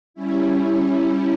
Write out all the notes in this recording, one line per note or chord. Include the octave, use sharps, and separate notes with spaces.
G3 C#4 E4